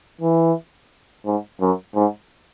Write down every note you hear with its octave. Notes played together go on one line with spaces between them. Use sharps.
E3
G#2
F#2
G#2